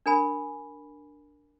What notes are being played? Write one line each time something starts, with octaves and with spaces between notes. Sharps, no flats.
D4 A#4 G#5 B5